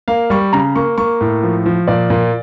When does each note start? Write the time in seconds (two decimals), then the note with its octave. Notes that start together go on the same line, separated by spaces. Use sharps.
0.08 A#3 F5
0.30 G3 C#6
0.53 C#3 A#5
0.76 A#3 C#6
0.98 A#3 C#6
1.21 A2
1.43 F3
1.66 F3
1.88 A#2 D5
2.10 A#2